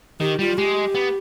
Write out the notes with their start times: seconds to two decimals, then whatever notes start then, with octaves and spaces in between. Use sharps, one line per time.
0.20 D#3 G4
0.39 G3 F4
0.58 G#3 G4
0.95 B3